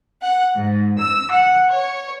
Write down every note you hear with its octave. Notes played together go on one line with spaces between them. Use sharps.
F#5
G#2
E6
F#5
C#5